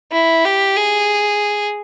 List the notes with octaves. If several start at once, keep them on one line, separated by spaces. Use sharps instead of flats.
E4
G4
G#4